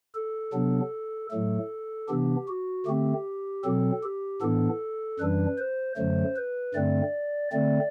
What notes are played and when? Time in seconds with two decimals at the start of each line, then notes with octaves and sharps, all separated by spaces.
0.15 A4
0.53 C3 F#3 B3 D4
1.31 A2 F#3 A3 A4
2.08 C3 E3 B3 D4 G4
2.48 F#4
2.86 D3 A3 C4 G4
3.64 B2 F#3 C4 A4
4.03 G4
4.41 A2 E3 B3 D4 A4
5.20 F#2 E3 G3 D4 B4
5.58 C5
5.97 F#2 D3 F#3 A3 C5
6.36 B4
6.74 G2 D3 A3 C4 D5
7.52 D3 A3 C4 D5